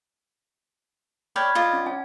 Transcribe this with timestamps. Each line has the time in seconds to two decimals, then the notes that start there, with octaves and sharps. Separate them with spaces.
1.36 C#5 D5 G5 B5 F6 G#6
1.55 F4 D5 D#5
1.73 C#4
1.86 C#4 G#5